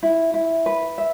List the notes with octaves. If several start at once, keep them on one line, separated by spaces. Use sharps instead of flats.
E4
E4
B4
E5